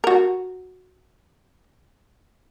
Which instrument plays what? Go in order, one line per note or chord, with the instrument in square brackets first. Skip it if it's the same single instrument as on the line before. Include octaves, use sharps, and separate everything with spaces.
[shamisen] F#4 A#4